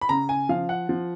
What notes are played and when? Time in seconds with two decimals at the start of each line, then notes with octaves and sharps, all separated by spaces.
0.01 B5
0.09 C#3 A#5
0.29 G#5
0.49 F3 F5
0.69 F#5
0.89 F3